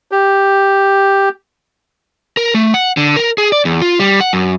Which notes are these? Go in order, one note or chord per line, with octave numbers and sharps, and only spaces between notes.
G4
A#4
A3
F#5
D3
A#4
G#4
D5
E2
F4
G3
F#5
F#2